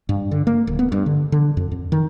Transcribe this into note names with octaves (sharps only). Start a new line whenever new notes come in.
G2
D3
A#3
D1
B3
G2
D3
D3
F2
F2
D#3